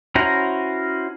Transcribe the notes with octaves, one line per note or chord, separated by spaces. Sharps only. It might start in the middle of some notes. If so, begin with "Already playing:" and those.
C#4 E4 F#4 C5 A#5